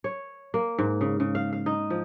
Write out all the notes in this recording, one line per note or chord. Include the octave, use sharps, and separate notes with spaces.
C#5
A#3
G#2
C#3
C#3
F5
F5
D#4
F3